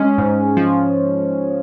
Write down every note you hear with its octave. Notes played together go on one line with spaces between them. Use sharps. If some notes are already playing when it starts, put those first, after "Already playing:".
Already playing: G#3 C#4
G#2
F3